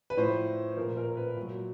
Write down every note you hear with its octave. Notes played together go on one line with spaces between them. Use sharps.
B4
A2 F3 C5
A#2 F3 A#4
A#4
B4
A#2 F#3